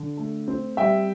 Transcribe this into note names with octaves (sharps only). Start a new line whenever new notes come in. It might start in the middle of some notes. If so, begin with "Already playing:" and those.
Already playing: D3
A3
C4
G3 E5 G5